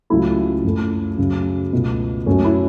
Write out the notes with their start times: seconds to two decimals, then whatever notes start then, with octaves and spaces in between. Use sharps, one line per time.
0.10 C#2 C#3 F#3 A3 E4
0.64 F#2 F#3 A3
1.18 F#2 C#3 A3
1.72 C#2 B2 A3
2.26 F#2 F#3 A3 C#4
2.45 E4